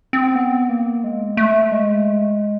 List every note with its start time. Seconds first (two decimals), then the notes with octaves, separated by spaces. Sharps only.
0.13 C4
0.35 B3
0.69 A#3
1.04 G#3
1.37 A3
1.72 G#3